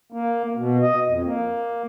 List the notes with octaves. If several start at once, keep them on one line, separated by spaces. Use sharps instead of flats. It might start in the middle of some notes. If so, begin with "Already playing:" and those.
A#3
B2
D#5
F2
A#3